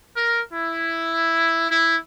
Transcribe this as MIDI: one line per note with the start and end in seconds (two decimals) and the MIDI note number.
0.16 0.41 70
0.53 1.68 64
1.69 1.96 64